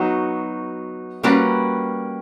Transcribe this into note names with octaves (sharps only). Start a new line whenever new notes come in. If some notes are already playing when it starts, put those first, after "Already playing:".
Already playing: F#3 B3 D#4 F#4
G3 A#3 C#4 F#4 B4